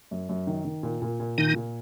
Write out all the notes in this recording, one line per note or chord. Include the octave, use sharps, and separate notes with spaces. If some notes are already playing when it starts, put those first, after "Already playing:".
F#2
F#2
D#3
D#3
A#2
A#2
A#2
A#2 D#3 D#4
A#2